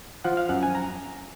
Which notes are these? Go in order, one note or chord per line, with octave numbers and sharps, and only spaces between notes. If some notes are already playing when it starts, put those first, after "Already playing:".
F3 F#5
F5
F#2 F#5
G#5
A#5